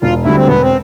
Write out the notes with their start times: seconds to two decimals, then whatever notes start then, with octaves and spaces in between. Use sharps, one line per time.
0.02 E1 F4
0.24 D2 D3 G3 E4
0.36 C4
0.46 E1 B3
0.62 C4